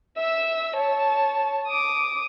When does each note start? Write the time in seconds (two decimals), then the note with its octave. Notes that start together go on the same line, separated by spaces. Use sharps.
0.17 E5 E6
0.76 C#5 A5
1.68 D6 D#6